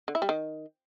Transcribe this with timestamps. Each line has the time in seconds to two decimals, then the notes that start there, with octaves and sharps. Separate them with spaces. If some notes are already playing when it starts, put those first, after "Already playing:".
0.08 D3
0.15 E4
0.22 G3
0.29 D#3